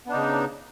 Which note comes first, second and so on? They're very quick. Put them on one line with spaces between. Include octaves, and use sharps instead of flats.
B3 D4 D#4 C#3